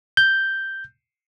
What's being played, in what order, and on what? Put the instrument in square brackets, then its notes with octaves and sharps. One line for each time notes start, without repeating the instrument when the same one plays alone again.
[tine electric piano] G6